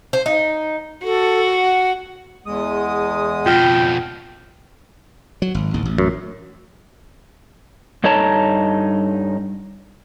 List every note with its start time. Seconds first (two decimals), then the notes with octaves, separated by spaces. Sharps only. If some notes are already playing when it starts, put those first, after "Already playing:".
0.13 C5
0.26 D#4
1.04 F#4 A4
1.59 F#5
2.46 E2 G#3 D#6
3.46 F2 B2 F4 G5 F6
5.42 F#3
5.55 G#1
5.74 A1 D#2
5.85 A1
5.98 F#2
8.04 G2 D#4 A4 C#5 A5 A#5